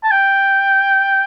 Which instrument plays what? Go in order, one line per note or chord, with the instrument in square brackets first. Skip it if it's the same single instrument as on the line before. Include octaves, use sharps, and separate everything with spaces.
[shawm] A5
G5